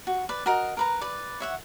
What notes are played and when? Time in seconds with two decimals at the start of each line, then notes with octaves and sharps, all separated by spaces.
0.07 F#4
0.29 B4 D5
0.46 F#4 A#4 D#5
0.77 A#4 B4 A#5
1.01 B4 D5
1.40 C#5 E5 F#5